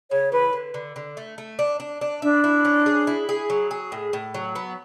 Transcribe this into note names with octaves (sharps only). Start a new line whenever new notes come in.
C#3 C#5
E3 B4
D3
D3
D3
A3
A3
D4
D4
D4
D4 E4
E4
C#4
G#4
E4
G#4
F#3
G#4
A2
A2
F#3
B3